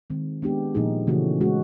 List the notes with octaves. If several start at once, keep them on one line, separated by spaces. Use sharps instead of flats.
D#3 G#3 C4
G#3 B3 D4 G4
A#2 F3 A#3 D#4 G#4
C#3 E3 A3 C#4 F#4
G#3 C#4 F#4